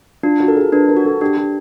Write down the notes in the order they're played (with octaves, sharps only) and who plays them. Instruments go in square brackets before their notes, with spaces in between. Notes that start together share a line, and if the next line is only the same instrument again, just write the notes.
[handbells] D4 [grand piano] F4
[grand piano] F#4
[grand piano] A4 [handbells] A#4
[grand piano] G#4
[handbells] D4 [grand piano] B4
[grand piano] A#4
[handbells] F#4
[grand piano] A4
[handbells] D4 [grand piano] G4
[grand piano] G4